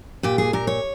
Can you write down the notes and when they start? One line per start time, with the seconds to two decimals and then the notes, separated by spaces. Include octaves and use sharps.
0.23 A#2 G4
0.38 G#4
0.53 A#2 A#4
0.67 C#5